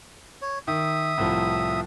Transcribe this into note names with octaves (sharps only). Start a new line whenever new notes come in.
C#5
D#3 E5 D#6
C2 A2 F3